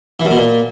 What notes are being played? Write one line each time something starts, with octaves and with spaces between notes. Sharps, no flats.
E3
F#2
B2
A#2